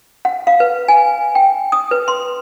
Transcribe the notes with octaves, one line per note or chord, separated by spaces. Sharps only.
F#5
F5
B4
G#5
G5
D#6
B4
C6